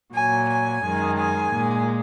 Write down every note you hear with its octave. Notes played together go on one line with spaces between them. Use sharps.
A#2 F#3 G#5
G#5
F#2 D#3 G#3
G#5
A#2 G#3